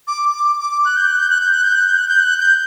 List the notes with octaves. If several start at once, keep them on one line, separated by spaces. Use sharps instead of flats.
D6
D6
D6
F#6
G6
F#6
G6
F#6
G6
F#6
G6
F#6
G6
F#6
G6
F#6
G6